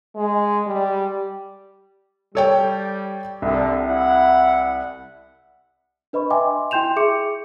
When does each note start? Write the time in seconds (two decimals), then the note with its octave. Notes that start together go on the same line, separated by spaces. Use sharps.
0.15 G#3
0.66 G3
2.35 G3 A4 C#5 G5
3.42 C2 D3
3.82 E4 F#5
6.13 D4 B4 D#5 B5 C#6
6.30 D#5 E5 G5 G#5 C6 D6
6.71 E4 G5 C6 G6 E7 F7
6.96 G#4 E5 C#6 D6 C#7